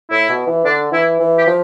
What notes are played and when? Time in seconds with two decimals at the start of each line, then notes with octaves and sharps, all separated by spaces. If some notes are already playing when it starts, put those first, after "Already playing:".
0.11 A2 E4
0.29 B2
0.47 E3
0.65 D3 D4
0.92 E3 E4
1.20 E3
1.38 G4
1.47 F3